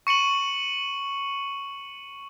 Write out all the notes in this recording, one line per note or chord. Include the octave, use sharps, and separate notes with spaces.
C#6 C#7 D#7 F#7